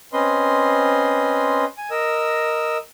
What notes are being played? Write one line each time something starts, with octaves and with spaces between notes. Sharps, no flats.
C4 C#4 B4 D#5 C6
G#5
A#4 D#5 E6